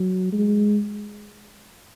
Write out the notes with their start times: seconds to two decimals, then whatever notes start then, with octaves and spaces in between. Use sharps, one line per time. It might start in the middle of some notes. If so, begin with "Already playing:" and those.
Already playing: F#3
0.32 G#3